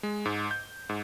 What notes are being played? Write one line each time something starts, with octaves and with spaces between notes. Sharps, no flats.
G#3
G#2
G6
G#2